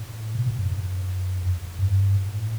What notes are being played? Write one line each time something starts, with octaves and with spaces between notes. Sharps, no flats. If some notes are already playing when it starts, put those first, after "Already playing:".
Already playing: A2
B2
A2
F#2
F#2
F#2
F#2
G2
A2